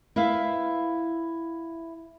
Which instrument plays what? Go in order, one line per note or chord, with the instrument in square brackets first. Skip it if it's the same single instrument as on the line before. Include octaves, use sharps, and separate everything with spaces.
[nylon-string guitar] E4 B4 E5 F5